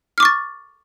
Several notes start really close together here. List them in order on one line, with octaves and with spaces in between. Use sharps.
F6 D6 C#6 A6